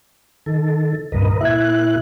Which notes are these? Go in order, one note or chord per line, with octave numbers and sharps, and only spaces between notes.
D#3 A4
C#2 G2 A#2 A#4 B4 D#5
A#2 E4 E5 F#6 G#6